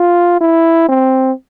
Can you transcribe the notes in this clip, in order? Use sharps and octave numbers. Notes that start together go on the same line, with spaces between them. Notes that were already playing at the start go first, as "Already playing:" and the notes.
Already playing: F4
E4
C4